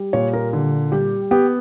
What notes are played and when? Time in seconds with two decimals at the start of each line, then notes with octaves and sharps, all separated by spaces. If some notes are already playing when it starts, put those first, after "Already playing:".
Already playing: G3
0.13 A#2 C#5
0.33 A#4
0.53 D3
0.92 G3 G4
1.31 B3 G4